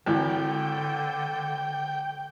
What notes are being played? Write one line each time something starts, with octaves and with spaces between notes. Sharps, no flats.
G#1 D3 E3 G5